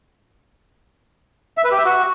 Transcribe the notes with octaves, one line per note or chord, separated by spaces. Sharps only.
E5
B4
G4
E5
F#4